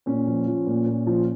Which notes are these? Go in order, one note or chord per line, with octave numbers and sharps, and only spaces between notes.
A#2 C#4
F3
F3
A#2
A#2
F3